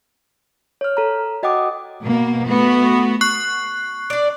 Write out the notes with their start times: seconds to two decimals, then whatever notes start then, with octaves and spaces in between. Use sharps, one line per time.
0.81 C#5 F6
0.97 A4 A#5
1.43 F#4 D#5 F#5 G5 D6 D#6
2.03 B2 A#3
2.46 A3 B3 F#4
3.21 C#6 F#6 C7
4.10 D4 D5